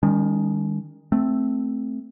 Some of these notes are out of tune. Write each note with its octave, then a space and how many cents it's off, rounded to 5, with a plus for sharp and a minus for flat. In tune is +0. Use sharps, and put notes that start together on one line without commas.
D#3 +0 G#3 -45 C#4 +35
A3 +0 C4 +0